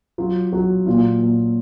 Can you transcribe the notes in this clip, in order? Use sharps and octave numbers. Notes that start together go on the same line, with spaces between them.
F#3 F4
F#3 F#4
A#2 F4
A#2